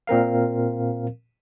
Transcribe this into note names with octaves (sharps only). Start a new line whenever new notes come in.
A#2 C4 A#4 F5